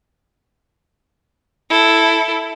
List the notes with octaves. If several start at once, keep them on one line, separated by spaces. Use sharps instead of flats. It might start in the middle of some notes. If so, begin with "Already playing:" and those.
E4 A4